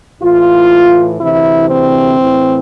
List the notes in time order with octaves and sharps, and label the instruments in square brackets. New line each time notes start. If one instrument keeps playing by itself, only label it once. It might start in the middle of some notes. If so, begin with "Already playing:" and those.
[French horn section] A2 E3 F4
D2 C3 E3 E4
C4
A2 E3